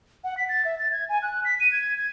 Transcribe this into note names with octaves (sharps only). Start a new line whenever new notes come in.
F#5
B6
A6
E5
A6
G#6
G#5
F#6
B6
D#7
G#6
G#6